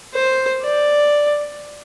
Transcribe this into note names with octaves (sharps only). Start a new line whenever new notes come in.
C5
D5